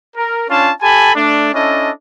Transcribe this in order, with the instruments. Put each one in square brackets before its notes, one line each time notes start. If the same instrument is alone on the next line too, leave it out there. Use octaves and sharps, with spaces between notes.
[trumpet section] A#4
C#4 D4 F4 C#5 A5
G4 A4 G#5 A5 B5
A3 D4
C#4 D4 E4 A4 D#5